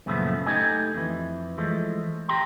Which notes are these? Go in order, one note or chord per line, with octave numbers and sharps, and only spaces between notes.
F#2 A#2 C#3 F3 A3 B3
A3 D#4 G4 D#5 G#5
F2 E3
E3 F3 G#3 A3
G4 G5 A#5 C6